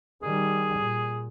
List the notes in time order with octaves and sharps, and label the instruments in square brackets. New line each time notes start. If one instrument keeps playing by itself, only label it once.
[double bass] D#3 G3 [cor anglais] G#4
[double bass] A#2